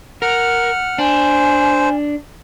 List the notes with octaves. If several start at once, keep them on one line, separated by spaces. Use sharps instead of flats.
A#4 F#5 F6
D4 C5 G#5